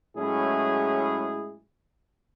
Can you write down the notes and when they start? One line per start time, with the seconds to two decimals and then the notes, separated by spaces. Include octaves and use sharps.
0.16 A2 F#3 G#3 C#4 E4 G#4